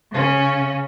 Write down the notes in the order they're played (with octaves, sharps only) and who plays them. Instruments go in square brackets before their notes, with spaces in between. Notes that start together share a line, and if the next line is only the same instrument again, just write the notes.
[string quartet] C#3 C#4